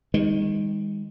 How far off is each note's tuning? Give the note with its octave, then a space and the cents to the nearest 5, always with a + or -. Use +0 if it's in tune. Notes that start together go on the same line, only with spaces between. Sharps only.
D#3 +5 G#3 -40